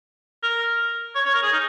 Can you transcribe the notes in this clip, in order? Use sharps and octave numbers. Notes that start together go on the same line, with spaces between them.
A#4
C#5
C#5
A#4
G#4
D#4